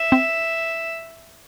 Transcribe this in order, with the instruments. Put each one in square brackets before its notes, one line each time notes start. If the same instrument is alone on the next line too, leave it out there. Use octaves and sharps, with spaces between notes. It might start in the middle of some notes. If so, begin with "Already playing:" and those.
Already playing: [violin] E5
[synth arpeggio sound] C4